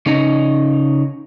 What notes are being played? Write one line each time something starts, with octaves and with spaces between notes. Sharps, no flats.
C#3 C#4 D#4